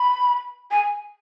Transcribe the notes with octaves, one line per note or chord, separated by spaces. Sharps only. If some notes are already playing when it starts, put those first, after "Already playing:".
Already playing: B5
G#5